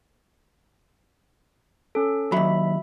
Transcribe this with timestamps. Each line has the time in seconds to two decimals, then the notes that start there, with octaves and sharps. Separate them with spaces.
1.95 C#4 A4
2.32 D#2 F#3 E5 B5